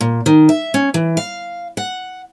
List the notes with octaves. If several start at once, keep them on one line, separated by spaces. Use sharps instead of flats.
A#2
D#3
E5
C#4
E3
F5
F#5